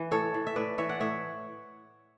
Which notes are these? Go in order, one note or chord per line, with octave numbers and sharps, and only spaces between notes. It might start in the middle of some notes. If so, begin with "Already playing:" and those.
Already playing: E3 B4
A2 A4 C#5
E3
E5
A2 B4 D5
E3 C#5 E5
D5 F#5
A2 C#5 E5